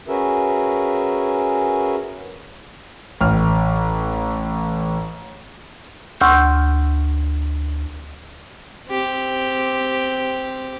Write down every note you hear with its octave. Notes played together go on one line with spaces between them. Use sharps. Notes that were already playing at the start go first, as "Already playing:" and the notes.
C#4 F#4 G#4 A#4 B4 E5
A1 F6
D2 C6 C#6 E6 G6
C4 G4